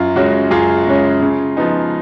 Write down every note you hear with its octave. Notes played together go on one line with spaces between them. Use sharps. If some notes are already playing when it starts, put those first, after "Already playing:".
Already playing: F#2 F4
C#3 G#3 C#4 F#4
F#2 F4 G#4
C#3 G#3 C#4
C#3
F3 B3 D#4